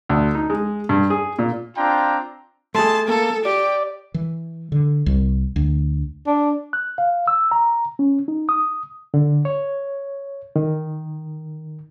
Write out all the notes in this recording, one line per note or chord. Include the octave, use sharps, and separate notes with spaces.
D2
D#4
G#3
G2
G#4
A#2
C4 D4 F4 G5 A#5
A3 G#4 A5 C6
A#3 A4
G4 D5
E3
D3
C2
D2
D4
F#6
F5
E6
A#5
C#4
D#4
D#6
D3
C#5
D#3